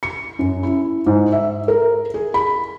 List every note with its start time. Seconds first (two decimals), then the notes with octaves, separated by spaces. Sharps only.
0.03 C#7
0.39 F#2
0.63 E4
1.06 G#2
1.32 E5
1.68 A#4
2.14 G#4
2.34 B5